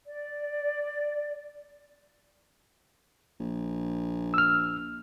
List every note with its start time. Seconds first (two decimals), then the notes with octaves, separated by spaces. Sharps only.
0.06 D5
3.40 A#1
4.34 E6 F6